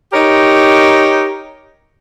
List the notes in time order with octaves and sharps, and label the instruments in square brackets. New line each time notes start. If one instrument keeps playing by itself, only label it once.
[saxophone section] D#4 G4 A#4 C#5